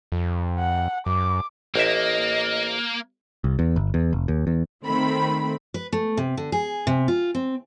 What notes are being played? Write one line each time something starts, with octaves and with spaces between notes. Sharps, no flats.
F2
F#5
F#2 D6
A1 A#3 D#5 E5
C2
E2
G1
E2
F1
D#2
E2
D#3 A3 C4 B5
B4
A3
C3
D3
G#4
C3
F4
C4